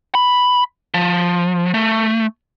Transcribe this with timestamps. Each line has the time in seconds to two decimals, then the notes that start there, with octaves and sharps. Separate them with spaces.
0.15 B5
0.94 F3
1.74 A3